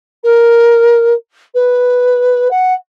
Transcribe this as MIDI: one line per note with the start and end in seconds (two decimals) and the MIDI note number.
0.23 1.12 70
1.54 2.48 71
2.50 2.73 78